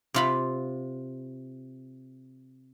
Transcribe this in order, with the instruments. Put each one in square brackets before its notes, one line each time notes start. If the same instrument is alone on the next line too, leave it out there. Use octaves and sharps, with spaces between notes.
[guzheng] C3 F4 B5